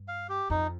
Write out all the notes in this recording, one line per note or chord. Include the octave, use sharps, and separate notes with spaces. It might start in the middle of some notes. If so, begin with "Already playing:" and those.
Already playing: G2
F5
G4
F2 D#4